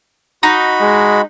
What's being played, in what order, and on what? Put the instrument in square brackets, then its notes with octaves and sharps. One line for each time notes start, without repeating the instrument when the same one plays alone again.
[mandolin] D#4 [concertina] F#4 B5
[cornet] G#3